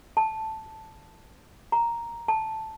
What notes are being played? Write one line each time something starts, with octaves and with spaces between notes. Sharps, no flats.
A5
A#5
A5